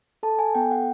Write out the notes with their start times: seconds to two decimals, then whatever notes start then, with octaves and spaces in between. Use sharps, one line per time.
0.23 A4 A5
0.39 G#5
0.55 B3 G5
0.71 F#5